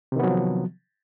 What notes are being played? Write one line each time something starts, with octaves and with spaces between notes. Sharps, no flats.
C3 D#3 F3 F#3 B3